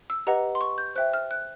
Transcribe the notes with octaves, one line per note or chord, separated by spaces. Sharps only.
E6
G4 B4 D#5 F#5 A#5
C6
C#6
G6
C5 E5 G5 F#6
F6
F#6